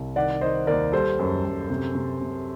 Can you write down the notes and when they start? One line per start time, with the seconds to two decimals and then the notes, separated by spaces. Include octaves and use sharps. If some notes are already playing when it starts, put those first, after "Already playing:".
Already playing: C2
0.16 D#3 D5 F#5
0.41 D#3 C5 D#5
0.67 D#2 A#4 D5
0.92 G3 A4 C5
1.19 F#2
1.45 F#2
1.70 C3
1.95 C3
2.21 C3